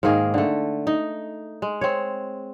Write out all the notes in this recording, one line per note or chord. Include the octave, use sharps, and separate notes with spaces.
G#2 D#3 A#3 G#4
D3 A3
D#4
G#3
C4 C#5